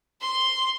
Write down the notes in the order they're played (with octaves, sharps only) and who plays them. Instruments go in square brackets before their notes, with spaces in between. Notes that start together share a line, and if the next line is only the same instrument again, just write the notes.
[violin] C6